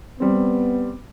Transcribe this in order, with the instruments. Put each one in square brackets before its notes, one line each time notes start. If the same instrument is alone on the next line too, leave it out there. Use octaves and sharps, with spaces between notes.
[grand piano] G3 C4 [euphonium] B3